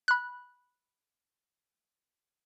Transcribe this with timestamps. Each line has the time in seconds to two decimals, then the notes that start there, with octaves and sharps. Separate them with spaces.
0.08 B5 F#6